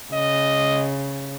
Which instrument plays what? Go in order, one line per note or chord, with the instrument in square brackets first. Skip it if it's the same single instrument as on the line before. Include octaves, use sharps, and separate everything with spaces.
[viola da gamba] C#3 [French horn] D#5